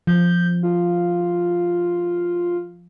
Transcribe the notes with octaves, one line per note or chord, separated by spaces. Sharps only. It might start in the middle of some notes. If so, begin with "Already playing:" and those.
F3 G6
F4